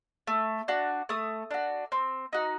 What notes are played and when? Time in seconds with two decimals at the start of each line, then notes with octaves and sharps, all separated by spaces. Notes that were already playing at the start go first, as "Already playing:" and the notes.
0.27 A3
0.68 D4 F#4
1.09 A3 D#6
1.51 D4 F#4
1.92 C4
2.33 D#4 F#4